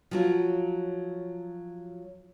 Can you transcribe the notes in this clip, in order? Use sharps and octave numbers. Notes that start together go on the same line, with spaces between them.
F3 F#3 F4